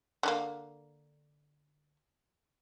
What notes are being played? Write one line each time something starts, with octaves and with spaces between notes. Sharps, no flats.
D3 A3 A#3